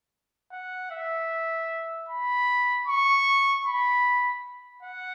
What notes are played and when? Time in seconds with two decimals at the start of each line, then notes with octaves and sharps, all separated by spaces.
0.52 F#5
0.91 E5
2.09 B5
2.87 C#6
3.65 B5
4.82 F#5